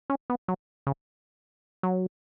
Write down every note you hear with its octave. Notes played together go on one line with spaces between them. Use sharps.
C#4
B3
F#3
C#3
F#3